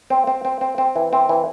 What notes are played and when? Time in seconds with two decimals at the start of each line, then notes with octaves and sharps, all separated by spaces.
0.10 C4
0.27 C4
0.45 C4
0.61 C4
0.78 C4
0.96 E3
1.13 C4
1.29 E3